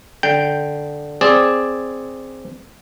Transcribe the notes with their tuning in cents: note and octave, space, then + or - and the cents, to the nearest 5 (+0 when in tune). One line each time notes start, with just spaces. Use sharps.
D3 +0 G5 +0
C4 +0 G#4 +0 D5 +0